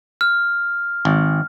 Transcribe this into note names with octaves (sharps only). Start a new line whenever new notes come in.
F6
G#1